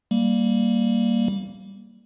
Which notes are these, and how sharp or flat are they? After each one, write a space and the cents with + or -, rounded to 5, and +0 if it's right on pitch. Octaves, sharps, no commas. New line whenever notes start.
G3 +0 A#3 +0